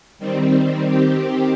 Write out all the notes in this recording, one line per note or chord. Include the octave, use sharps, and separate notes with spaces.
D#3 G3 C4
D#3 C4 G4